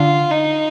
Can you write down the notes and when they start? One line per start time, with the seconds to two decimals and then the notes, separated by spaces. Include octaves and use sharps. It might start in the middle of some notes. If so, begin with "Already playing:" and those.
Already playing: D3 F4
0.31 D#4